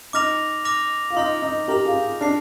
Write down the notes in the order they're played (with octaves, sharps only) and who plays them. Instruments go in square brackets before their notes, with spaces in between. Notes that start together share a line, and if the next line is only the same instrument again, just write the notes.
[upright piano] D#4 [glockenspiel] D6 F6 A#6 F7
[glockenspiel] D6 F6 A#6 F7
[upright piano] F4
[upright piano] D#4 [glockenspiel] C6 F6 A#6 F7
[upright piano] D#4
[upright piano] G4 A#4 [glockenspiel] C6 F6 A#6 F7
[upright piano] F4 G#4
[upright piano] D4 [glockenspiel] D6 F6 C7